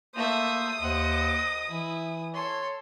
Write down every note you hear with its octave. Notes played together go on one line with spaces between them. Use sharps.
A3 A#3 C5 E5 D#6
D#2 C5 D#5 F#5
E3 E4
A4 C#5 C6